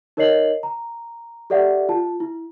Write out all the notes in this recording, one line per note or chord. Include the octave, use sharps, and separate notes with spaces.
D#4 A#4 C#5 D#5 C7 F#7
A#5
G4 A4 D5 E5 F#5
F4 A5
E4